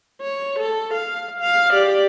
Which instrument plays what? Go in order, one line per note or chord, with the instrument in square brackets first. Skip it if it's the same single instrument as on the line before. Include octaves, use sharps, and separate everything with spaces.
[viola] C#5
A4
F5
F5
G4 D5